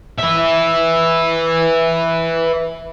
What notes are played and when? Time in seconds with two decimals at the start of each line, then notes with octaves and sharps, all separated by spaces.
0.19 B4 E5